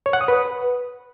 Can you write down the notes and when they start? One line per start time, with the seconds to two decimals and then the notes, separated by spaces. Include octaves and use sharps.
0.06 C#5
0.13 F#5
0.21 D#6
0.28 B4